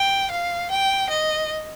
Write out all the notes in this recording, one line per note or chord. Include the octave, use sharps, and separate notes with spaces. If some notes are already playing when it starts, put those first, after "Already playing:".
Already playing: G5
F5
G5
D#5